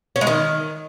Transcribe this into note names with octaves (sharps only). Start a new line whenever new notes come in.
C#4
G#3
D#3